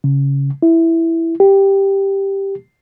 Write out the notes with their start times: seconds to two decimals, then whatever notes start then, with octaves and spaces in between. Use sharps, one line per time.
0.04 C#3
0.62 E4
1.40 G4